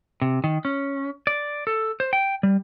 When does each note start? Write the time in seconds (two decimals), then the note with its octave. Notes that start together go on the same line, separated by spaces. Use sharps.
0.22 C3
0.44 D#3
0.65 C#4
1.27 D5
1.67 A4
2.00 C5
2.13 G5
2.43 G3